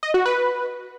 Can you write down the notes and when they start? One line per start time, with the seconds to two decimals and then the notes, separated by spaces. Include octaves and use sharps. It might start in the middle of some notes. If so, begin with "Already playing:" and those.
0.03 D#5
0.14 F#4
0.26 B4